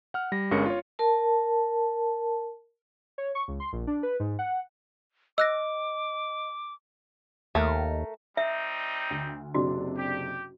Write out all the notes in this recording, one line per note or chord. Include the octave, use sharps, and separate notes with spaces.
F#5 F6
G3 A#6
G1 G2 G#3 C#4 A#4 C#7
F4 C#5
A#4 A5
C#5
C#6
C#2
C6
A#1
D4
B4
G#2
F#5
D#5 D6 E6 F#6 A#6
D#2 A3 A#4
G3 C4 D#4 E5
D2
F#1 C3 D4 F#4
G4